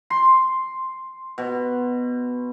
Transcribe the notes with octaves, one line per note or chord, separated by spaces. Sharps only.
C6
B2